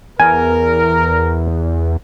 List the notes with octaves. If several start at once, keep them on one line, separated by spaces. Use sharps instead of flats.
E2 A#4 G#5